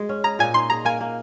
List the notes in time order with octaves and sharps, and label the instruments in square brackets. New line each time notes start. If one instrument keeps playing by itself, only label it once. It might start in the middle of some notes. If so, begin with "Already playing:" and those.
Already playing: [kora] G#3
C#4
[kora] G#4 [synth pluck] A#5
[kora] A#2 [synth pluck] G#5
[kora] D#4 [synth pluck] C6
[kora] G#4 [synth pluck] A#5
[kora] A#3 [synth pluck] G#5
[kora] A#3